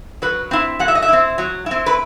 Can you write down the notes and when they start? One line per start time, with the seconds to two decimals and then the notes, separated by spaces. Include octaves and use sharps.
0.22 F#3 B4
0.51 C4 E4
0.79 F#3 F#5
0.88 E5
0.95 D#5
1.02 E5
1.08 C4 E4
1.38 F#3
1.66 C4 E4
1.86 B4